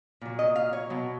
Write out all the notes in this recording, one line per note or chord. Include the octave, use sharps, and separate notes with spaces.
A#2 F#3
D#5
F5
C#5
B2 F#3